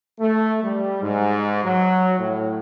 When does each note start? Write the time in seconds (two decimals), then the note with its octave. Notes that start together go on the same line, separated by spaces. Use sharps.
0.20 A3
0.63 G3
1.02 G#2
1.63 F#3
2.20 A2